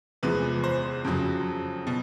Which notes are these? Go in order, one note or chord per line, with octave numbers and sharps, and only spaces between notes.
E2 C3 F3 G#3 B4
C5
F2 C#3 F#3
B2